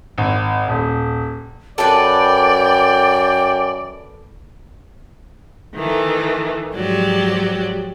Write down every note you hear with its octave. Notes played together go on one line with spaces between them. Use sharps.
G#1
D#1
F#2 A4 B4 D5 G5
D#3 E3 A3
G#2 F3 F#3 G4 D5